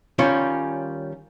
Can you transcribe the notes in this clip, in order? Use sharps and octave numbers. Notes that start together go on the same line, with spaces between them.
D#3 G3 C#4 F4 C#5